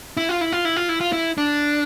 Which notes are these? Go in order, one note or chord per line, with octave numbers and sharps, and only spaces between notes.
E4
F4
E4
F4
E4
F4
E4
F4
E4
D4